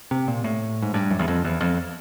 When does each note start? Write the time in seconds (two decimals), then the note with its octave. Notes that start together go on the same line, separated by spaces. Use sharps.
0.11 C3
0.28 A#2
0.44 A2
0.82 G#2
0.94 G2
1.11 F#2
1.19 E2
1.28 F2
1.44 E2
1.61 F2